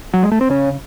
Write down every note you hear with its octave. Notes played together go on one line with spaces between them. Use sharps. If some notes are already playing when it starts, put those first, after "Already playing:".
F#3
G#3
A3
C4
C#3 C#4